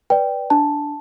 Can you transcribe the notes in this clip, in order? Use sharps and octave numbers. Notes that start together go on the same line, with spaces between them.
B4 D5 G5
D4 A5